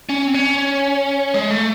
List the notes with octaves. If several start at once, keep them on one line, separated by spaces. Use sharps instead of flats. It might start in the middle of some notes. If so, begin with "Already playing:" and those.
C#4
C4
C#4
G#3
A3